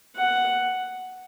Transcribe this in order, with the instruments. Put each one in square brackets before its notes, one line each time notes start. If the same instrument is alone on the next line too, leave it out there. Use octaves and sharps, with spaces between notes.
[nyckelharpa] F#5